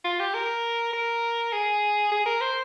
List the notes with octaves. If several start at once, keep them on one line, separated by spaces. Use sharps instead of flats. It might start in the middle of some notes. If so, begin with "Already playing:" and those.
F4
G4
A#4
A#4
G#4
G#4
A#4
C5